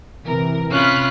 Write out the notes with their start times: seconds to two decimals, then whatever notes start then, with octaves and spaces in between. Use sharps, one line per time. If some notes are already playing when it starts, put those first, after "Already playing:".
0.25 C3 E3 A#4
0.71 C3 C#4 F4 B5 F6 F#6